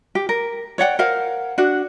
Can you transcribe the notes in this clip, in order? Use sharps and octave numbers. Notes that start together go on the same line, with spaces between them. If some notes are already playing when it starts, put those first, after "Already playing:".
G4
A#4
C#5 D5 F#5 G5
A#4 C5 F5 F#5
D4 F#4 F#5